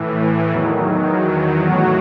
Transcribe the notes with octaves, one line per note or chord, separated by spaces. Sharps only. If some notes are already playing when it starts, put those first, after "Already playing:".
Already playing: A2 E3
E2 D#3 F#3
A2 F#3 F#4